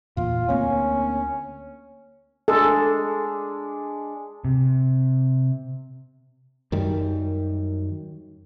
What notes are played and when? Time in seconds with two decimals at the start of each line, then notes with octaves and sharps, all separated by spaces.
0.17 E2 A#2 F4
0.49 D2 A#3 C4 C#4
2.48 G#3 D4 A4
4.45 C3
6.72 F#2 D#3 G3